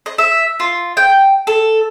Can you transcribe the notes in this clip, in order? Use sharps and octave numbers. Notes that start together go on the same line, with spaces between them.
D#5
E5
F4
G5
A4